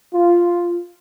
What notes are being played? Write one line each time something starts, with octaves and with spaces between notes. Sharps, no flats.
F4